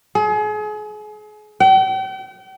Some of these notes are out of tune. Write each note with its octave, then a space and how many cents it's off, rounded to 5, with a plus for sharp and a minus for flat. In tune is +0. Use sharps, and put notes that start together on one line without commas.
G#4 +35
G5 -40